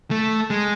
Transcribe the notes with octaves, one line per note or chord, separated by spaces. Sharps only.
A3
G#3